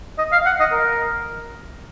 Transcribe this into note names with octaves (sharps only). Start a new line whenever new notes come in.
D#5
F5
F#5
D#5
A#4